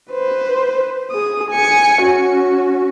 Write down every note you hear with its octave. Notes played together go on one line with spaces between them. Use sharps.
B4 C5
G#4 D#6
G#5 C#7
C#4 F#4